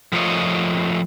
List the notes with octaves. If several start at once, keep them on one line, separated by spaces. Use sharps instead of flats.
F3 A3 F4 A#4 C#5 D#5